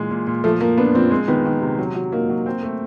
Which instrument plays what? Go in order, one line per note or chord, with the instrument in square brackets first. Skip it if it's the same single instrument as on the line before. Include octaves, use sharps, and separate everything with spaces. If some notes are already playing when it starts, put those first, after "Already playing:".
Already playing: [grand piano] A#2 E3 G#3
A#2
A#2
[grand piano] F3 [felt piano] A3
[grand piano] F3 [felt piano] A#3
[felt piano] B3 [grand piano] D4
[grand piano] F3 [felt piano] C4
[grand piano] G#3 [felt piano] C4
[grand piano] D#3 [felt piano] B3
[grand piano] D#3
C3
F#3
F#3
[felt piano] A#3 [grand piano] D#4
[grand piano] F#3
C4
A3